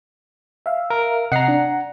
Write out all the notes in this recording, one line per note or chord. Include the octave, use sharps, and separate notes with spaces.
E5 F5
A#4
C3 D#5 F#5 A#5 C7
D4